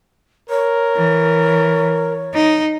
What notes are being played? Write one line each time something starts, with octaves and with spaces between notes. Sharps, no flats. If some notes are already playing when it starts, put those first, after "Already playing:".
A#4 C#5
E3
D#4